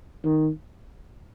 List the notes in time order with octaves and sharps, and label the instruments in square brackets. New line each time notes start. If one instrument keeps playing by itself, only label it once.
[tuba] D#3